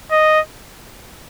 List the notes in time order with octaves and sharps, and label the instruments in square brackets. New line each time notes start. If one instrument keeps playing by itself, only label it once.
[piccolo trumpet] D#5